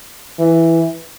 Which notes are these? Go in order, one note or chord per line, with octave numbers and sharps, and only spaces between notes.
E3